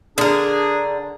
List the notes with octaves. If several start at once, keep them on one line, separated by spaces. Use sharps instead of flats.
D3 D4 G#4 A#4